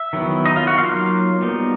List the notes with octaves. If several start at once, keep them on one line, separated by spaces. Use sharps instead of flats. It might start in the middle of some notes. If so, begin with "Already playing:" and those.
Already playing: E5
D#3 F#3 B3 E4
D#4 D#5
F4 F5
F#4 F#5
F#3 A#3 D#4 F4 F5
G3 B3 D#4